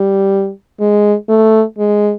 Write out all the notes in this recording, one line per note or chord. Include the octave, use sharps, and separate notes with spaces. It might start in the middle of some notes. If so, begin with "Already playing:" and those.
Already playing: G3
G#3
A3
G#3